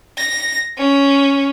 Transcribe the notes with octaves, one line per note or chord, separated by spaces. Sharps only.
A#6
C#4